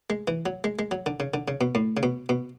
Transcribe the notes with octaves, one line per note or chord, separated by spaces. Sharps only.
G#3
E3
F#3
G#3
G#3
F#3
D3
C#3
D3
C#3
B2
A2
C#3
B2
B2